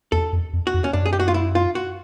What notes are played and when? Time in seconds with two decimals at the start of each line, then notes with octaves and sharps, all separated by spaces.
0.12 E2 A4
0.33 F2
0.53 F2
0.67 F#4
0.74 F2
0.84 C#4
0.93 F#2 D4
1.06 G#4
1.13 G4
1.20 F#4
1.28 F4
1.34 E4
1.55 F4
1.75 F#4